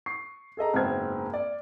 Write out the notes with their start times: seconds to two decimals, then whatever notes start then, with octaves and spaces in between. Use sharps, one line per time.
0.06 C#6 C7
0.57 G#4 A4 D#5 A#5
0.74 F#1 G#2 B3 C4 F6 G#6
1.33 D5